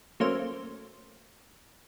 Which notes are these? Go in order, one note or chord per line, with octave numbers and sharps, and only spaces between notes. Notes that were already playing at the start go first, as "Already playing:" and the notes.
F#3 A3 A#3 C#4 C5